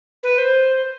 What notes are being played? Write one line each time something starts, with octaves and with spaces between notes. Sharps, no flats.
B4
C5